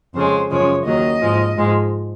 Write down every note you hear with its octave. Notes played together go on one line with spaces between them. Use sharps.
F2 C#3 G#3 C5
F#2 C#3 F3 G#3 C#5
D#2 D#3 F#3 D#5
G#2 F3 G#3
G#2 F3 G#3